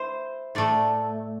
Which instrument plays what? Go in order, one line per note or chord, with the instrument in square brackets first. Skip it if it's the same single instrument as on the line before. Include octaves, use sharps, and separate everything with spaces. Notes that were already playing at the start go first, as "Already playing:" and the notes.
Already playing: [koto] E4 C5
A2 A3 D5